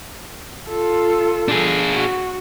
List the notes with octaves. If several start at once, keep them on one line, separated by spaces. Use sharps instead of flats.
F4 A4
D4 G#4
F#4